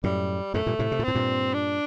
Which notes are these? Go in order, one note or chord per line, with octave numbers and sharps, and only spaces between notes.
F#2 A2 G3
F#2 A2 A3
G2 A#2
A2 C3
C3
A#2
A2 C4
G2 A#2
D4